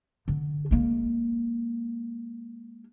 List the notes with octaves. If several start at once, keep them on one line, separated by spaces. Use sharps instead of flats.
D3
G#3 A#3